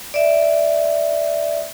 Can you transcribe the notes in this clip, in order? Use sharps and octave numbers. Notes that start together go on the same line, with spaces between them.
D5 E5